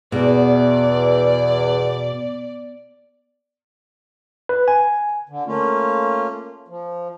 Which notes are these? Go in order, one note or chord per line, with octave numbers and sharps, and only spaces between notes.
E2 B2 D5
B4
G#5
D3
A3 A#3 C#4 F4
F3